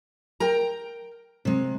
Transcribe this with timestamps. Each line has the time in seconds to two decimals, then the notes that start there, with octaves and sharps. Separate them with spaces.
0.40 A#4 G5 A#5
1.45 C3 G#3